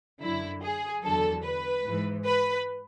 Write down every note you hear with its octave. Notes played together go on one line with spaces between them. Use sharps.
F#2 D3 F#3 E4
G#4
E2 D3 F#3 A4
B4
G#2 E3
B4